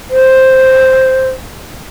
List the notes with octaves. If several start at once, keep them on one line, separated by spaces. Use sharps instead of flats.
C5